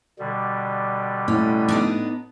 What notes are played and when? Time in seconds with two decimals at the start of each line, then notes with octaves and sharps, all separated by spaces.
0.19 B2 D3 G3
1.28 A2 C#4
1.68 B3 D4 D#4